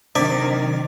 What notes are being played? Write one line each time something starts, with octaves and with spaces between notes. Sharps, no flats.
C3 D#3 F#3 D4 C5 D5